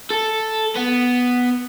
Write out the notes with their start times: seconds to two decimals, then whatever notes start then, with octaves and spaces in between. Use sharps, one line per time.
0.10 A4
0.75 B3